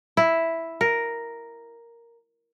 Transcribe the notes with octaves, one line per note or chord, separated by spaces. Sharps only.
E4
A#4